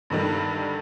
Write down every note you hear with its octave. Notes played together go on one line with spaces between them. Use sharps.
G2 D3 D#3 G3